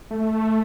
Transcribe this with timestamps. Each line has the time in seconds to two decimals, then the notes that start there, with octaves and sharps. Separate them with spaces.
0.11 A3